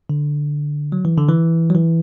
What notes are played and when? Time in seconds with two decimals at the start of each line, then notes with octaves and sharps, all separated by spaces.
0.09 D3
0.92 F#3
1.05 E3
1.17 D3
1.29 E3
1.70 F#3
1.75 E3